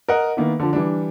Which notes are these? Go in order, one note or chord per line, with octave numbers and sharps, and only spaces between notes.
A#4 D#5 F#5
D#3 A#3 B3 E4
D3 F3
E3 G3 D4